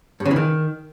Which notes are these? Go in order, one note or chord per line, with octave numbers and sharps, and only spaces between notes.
G2
C#3
E3
D#3